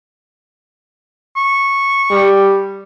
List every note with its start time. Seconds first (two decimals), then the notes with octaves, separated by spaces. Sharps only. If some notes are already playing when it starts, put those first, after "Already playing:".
1.37 C#6
2.11 G3